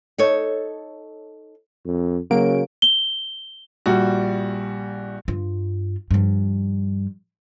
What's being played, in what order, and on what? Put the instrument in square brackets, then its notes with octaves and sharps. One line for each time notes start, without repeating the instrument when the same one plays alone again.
[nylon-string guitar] D#4 A4 C#5
[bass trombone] F2
[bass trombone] C#3 [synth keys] F#3 A#3 D7
[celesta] G7
[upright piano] A#1 G3 F#4
[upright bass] G2 F4
G2 F3